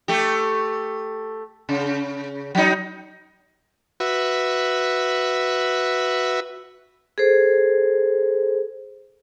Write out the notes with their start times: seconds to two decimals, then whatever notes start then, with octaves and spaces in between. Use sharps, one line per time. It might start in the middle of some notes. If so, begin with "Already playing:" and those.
0.08 A3 G4
1.69 C#3
2.55 F#3 D#4
4.00 F#4 B4 E5
7.18 G#4 A4 C5